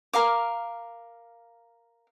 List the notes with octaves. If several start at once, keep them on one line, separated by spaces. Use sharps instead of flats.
A#4 F5 D6